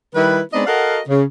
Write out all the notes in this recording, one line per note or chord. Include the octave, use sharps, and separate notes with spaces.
D#3 G3 E4 B4
G#3 B3 C4 D4 D#4 D#5
F#4 A4 A#4 D#5 F5 F#5
C#3